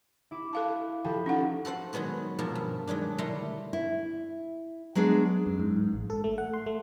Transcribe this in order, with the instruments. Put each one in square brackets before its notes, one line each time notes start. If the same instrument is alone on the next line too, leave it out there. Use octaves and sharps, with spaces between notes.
[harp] E4 D6 E7
[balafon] A4 F5 A5
[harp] F3 A4 B4 [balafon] G5
[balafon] C#4 D#4 F#5
[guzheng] F#4 A4 C5 F#5
D#3 F#3 G#3 B3 F#4
G#2 B2 F3 A#3 A#4 A5
G2
D#3 F#3 G#3 D4
D3 G3 A3 E4 A#5 C6
[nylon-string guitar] E4
F#3 G#3 B3 D4 G#4
[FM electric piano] F#2
G#2
G#2
A1
A4
A3
F#5
C6
A3